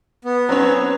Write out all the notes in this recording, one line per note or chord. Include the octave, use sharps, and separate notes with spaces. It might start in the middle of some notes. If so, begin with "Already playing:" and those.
B3
F#3 C4 C#4